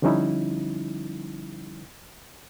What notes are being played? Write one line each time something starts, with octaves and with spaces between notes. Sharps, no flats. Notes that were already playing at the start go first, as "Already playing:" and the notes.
D3 F3 G3 C#4 D#4 E4